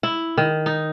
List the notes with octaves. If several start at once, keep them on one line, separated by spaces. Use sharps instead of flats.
E4
D#3
D#4